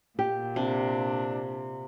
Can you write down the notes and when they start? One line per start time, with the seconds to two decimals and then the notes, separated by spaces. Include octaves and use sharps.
0.19 A#2 G4
0.56 C3 D4